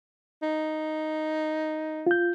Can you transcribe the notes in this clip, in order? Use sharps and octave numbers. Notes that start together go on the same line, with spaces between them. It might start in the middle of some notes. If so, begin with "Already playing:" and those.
D#4
F4 G6